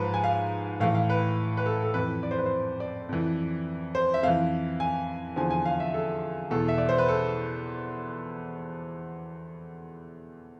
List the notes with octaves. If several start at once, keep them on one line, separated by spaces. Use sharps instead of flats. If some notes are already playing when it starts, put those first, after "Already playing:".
Already playing: G#2 F3 B4
G#5
F5
A2 E3 F5
F5
B4
B4
A4
A4
F2 E3 B4
D5
C5
B4
C5
D5
F2 E3
C5
E5
F2 E3 F5
G#5
E2 D3 F3 G#5
G#5
F5
E5
A4
E2 B2 A4
E5
D5
C5
B4
A4